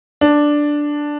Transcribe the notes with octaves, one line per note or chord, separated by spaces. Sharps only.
D4